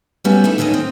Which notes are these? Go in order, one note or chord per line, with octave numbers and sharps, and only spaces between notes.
G3 A3 B3 C#4 F#4
A3 D#4 E4
D2 D#3 C#4 D#4 D#5
C4